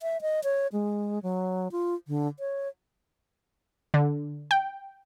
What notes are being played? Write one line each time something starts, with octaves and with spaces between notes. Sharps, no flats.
E5
D#5
C#5
G#3
F#3
F4
D3
C#5
D3
G5